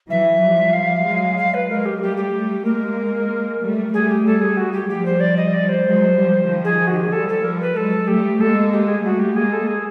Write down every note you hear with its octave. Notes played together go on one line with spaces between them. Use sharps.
E3 F#3 E5
F3 G3
F5
F#3 G#3
F5
B4
F#3 G#3 A#4
G4
G3 A3 G4
G4
G3 A3
G#3 A#3 A#4
G3 A3
G3 A3 G#4
G4
G3 A3 A4
G#4
F#4
G4
F3 G3 G4
C5
D5
D#5
D5
C5
F#3 G#3
F3 G3
D#3 F3
G#4
F#4
G4
G#4
F3 G3 A4
A4
F3 G3 A#4
B4
F#3 G#3 A4
G3 A3 G4
G#3 A#3 A4
G4
G#4
G3 A3 F#4
G4
G#3 A#3 G#4
A4
G#4